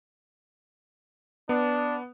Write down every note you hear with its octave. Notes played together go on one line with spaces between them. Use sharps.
B3 D4